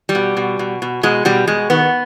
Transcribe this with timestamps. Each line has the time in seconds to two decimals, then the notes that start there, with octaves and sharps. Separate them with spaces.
0.09 G3
0.15 B2
0.37 B2
0.59 B2
0.82 B2
1.03 B2 G#3
1.25 B2 G3
1.47 B2 G#3
1.70 D#3 B3